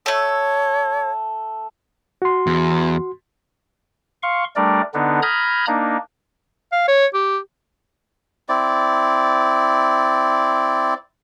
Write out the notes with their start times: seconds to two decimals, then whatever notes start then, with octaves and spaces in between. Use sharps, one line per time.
0.06 A3 A4 C#5
2.22 F#4 C6
2.47 E2
4.23 F5 C6 C#6
4.56 G3 A3 D4 A#4 D5
4.94 D3 B3 D4 D#4
5.23 A#5 B5 D#6 F6 G6 G#6
5.67 A#3 D4 D#4
6.72 F5
6.88 C#5
7.14 G4
8.49 C4 E4 D5